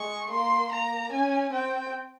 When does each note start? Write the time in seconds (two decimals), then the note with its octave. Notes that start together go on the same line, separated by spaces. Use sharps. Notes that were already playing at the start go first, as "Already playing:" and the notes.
Already playing: G#3 C#6
0.30 A#3 C6
0.71 A#3 A#5
1.12 C#4 G#5
1.53 C4 G5